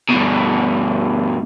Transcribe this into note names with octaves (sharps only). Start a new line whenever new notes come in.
G2 B2